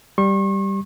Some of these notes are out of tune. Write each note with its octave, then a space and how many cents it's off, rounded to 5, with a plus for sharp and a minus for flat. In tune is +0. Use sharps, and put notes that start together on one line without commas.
G3 +0 C#6 -40